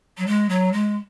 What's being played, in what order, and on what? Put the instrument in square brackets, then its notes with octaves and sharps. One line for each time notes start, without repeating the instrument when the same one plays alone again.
[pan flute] F#3
G#3
F#3
G#3